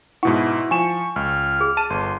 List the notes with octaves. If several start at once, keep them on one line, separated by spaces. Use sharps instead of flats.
G#2 B2 E4 F#5 C#6
F3 G#5 C#6 E7
C#2 F6
G#4
A5 D#7
G1 C6